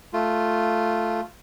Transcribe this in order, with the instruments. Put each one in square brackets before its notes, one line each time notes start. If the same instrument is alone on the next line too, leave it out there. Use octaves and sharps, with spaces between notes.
[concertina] A3 F4